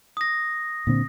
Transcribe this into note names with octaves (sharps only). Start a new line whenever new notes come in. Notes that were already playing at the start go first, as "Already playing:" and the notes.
D#6 A#6
A#2 D3 C4